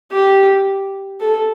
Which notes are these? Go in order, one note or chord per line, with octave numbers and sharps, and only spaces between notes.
G4
A4